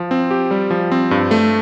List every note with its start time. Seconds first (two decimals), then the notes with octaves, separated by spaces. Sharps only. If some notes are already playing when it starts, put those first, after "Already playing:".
Already playing: F3
0.11 C4
0.31 G4
0.51 G3
0.71 F3
0.92 C4
1.11 G2
1.31 A3